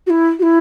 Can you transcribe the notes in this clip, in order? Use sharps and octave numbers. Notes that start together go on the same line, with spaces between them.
F#4
E4
F#4
E4